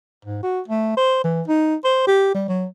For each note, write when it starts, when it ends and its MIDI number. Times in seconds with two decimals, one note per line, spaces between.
0.25 0.43 44
0.43 0.61 66
0.68 0.93 57
0.97 1.20 72
1.24 1.42 52
1.48 1.75 63
1.84 2.06 72
2.07 2.31 67
2.34 2.45 55
2.48 2.66 54